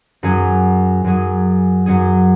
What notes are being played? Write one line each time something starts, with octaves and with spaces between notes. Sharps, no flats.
F#2 F#3 C#4 G#4
F#2 F#3 C#4 G#4
F#2 F#3 C#4 G#4